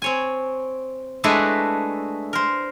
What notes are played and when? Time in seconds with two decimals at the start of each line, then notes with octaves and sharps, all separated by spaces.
0.02 C4 C#5 G#5
1.24 G#3 A3 D4 E4 F#4 B4
2.33 A#4 C5